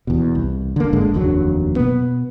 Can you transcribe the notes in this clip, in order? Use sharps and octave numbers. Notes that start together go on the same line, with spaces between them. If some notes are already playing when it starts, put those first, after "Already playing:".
E2 B2
C2
D3 A#3
G1 G#2 D3 G#3
F1 D#2 F#3 D4
B2 B3